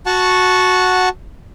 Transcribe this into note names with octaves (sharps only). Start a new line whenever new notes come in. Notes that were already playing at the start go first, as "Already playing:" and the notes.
F#4 F#5 A5 C#6